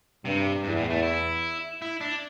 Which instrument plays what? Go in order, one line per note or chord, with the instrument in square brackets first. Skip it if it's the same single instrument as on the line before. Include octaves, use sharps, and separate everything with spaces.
[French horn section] G2 [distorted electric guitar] C3
[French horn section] E2 [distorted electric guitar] G2
[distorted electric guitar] A2
A3
E4
E4
D4